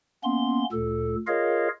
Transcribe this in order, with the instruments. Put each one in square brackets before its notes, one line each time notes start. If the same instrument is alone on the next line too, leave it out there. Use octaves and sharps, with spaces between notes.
[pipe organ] A#3 B3 C#4 C6
D2 A#2 A4
F4 G#4 A#4 C#5 D#5 F5